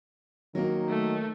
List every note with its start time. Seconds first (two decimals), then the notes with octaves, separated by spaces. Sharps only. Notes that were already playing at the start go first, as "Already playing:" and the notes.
0.55 D#3 F#3 A#3
0.89 A3